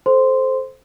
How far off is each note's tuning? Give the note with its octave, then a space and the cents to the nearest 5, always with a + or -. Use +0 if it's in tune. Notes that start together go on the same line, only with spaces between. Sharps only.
A4 -20 C5 +0 C6 -10